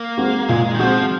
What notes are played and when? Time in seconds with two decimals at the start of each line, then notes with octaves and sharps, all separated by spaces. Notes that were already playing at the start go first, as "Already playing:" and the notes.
Already playing: A#3
0.17 G#3 C4 F#4
0.49 A#2 G#3
0.74 D#3
0.79 F3 G#3 C4 F#4